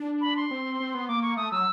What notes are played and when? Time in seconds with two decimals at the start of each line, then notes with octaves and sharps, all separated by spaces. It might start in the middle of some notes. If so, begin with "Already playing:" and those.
Already playing: D4
0.21 B5
0.37 C6
0.51 C4
0.80 C4
0.95 B3
1.08 A#3 D6
1.22 C#6
1.37 A3 D#6
1.52 F#3 E6